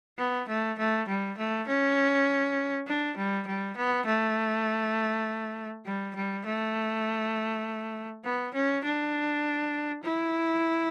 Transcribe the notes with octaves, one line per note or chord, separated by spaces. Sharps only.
B3
A3
A3
G3
A3
C#4
D4
G3
G3
B3
A3
G3
G3
A3
B3
C#4
D4
E4